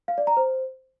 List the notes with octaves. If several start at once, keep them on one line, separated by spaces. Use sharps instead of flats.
F5
D5
A#5
C5